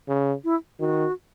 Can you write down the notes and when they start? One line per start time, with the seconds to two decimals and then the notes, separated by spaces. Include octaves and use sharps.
0.08 C#3
0.44 E4
0.80 D#3 F#4